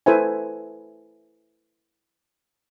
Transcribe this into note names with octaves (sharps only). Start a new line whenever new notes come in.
E4 A4 B4 C5 E5 G#5